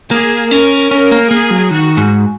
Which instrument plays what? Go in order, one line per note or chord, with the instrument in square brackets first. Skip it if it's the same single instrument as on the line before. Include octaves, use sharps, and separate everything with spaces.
[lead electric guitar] A#3 [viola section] G#4
[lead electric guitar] C#4 [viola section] A#4
[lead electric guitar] C#4 [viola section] A#4
[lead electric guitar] A#3
[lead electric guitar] A#3 [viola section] G#4
[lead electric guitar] F#3
[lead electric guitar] D#3 [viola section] F#4
[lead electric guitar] G#2